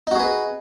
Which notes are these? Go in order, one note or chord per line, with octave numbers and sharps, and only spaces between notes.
D#4 F#4 G#4 B4